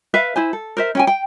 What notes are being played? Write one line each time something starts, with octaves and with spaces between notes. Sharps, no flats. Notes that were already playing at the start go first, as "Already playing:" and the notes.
B4 E5 F5
E4 C5 G#5
A4
A#4 C5 E5
C#4 G5 G#5
G5